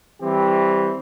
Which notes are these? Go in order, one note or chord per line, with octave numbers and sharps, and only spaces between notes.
E3 G3 C4 G4